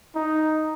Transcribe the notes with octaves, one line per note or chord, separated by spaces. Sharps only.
D#4